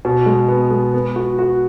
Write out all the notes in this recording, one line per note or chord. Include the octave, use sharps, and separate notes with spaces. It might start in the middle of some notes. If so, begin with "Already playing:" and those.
B2
G#3
B3
G#3
B3
F#4
F#4